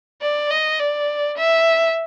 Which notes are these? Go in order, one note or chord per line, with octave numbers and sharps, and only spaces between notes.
D5
D#5
D5
E5